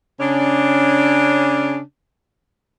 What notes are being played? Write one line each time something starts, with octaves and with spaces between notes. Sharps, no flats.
C#3 C#4 D4